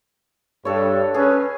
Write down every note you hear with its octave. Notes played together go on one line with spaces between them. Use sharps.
G2 A4 C#5
C#4 G#4 B4